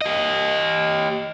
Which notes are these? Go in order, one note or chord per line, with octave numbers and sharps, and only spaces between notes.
G4 D#5